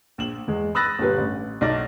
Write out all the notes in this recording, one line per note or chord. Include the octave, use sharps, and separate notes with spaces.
A#1 E7 F#7
E2 G#3
B5 D#6 E6 F#6 A6 A#6
G1 A#2 G3 B4
A1
B1 D#4 D5 A#6